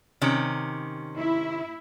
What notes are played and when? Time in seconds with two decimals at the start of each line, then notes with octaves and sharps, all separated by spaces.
0.21 C3 D#3 C#4
1.18 E4